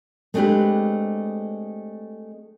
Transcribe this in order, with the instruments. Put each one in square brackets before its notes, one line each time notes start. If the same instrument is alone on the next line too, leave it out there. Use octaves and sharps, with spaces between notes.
[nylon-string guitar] G#3 A3 C4 D4 G4 B4